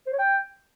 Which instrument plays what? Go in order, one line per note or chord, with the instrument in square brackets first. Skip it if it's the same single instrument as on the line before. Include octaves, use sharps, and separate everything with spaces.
[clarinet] C5
C#5
G5